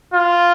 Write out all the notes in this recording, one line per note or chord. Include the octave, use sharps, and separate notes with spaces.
F4